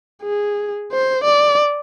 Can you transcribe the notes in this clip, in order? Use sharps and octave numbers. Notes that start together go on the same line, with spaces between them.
G#4
C5
D5